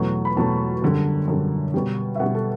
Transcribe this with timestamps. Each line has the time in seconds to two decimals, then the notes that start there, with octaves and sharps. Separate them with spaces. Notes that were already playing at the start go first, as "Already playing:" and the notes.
Already playing: E2 B2 F#3 A3
0.25 B5
0.37 E2 B2 F#3 A3 A5
0.82 F#2 D3 G3
1.28 F#2 D3 G3
1.74 B2 G3
2.15 E5
2.20 B2 G3 F#5
2.35 A4